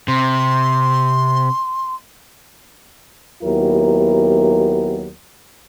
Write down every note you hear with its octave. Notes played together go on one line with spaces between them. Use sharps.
C3 C6
D#2 F#3 B3 E4 G4 A#4